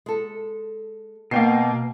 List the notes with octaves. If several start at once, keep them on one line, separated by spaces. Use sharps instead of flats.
G#3 A4
B2 A#3 B3 G5 C7